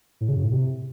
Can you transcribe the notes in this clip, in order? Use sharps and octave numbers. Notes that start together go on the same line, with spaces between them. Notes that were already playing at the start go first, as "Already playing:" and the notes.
A2
C#3
F#2
A2
C3